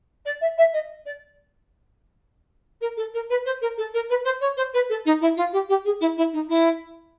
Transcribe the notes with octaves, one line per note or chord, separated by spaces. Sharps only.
D5
E5
E5
D#5
D5
A#4
A4
A#4
B4
C5
A#4
A4
A#4
B4
C5
C#5
C5
B4
A4
D#4
E4
F4
G4
G4
G#4
E4
E4
D#4
E4